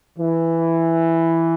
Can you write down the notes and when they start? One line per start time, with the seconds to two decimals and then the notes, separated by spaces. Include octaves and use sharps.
0.18 E3